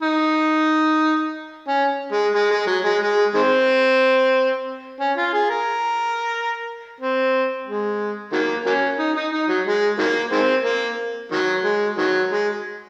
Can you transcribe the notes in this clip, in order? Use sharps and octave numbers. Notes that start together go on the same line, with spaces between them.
D#4
C#4
G#3
G#3
G#3
F#3
G#3
G#3
D#3 G#3 C4
C#4
F4
G#4
A#4
C4
G#3
D#3 F#3 A#3
F#3 A#3 C#4
D#4
D#4
D#4
F#3
G#3
D#3 F#3 A#3
D#3 G#3 C4
A#3
D#3 F#3
G#3
D#3 F#3
G#3